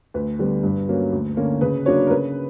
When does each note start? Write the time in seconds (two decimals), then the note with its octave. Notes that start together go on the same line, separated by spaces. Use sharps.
0.14 D2 B4
0.39 D3 G3 B3
0.63 G2
0.88 F#3 A#3 C#4
1.12 D2
1.37 D3 A#3 C#4
1.61 C#3 B4
1.86 F#3 A#3 D4 C#5
2.07 A#4
2.11 C#3 B4